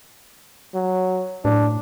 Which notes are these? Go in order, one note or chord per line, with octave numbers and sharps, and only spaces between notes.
F#3
A2 D4